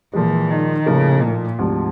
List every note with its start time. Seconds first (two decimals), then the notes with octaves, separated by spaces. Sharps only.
0.14 A#2 E3 F3 G#3
0.51 D#3
0.86 A2 C#3 F3 A#3 D#4
1.22 A#2
1.59 D2 G#2 C3 F3